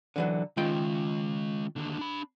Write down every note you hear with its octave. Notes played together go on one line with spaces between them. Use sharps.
D3 E3 F#3
D#3 G#3 C#4 F4 G5
D#2 D3
D4 B5